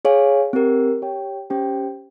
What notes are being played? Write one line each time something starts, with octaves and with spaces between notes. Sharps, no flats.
G#4 C#5 F5 G#5
C4 G4 A#4
G4 C#5 G5
C#4 G4 C5 G5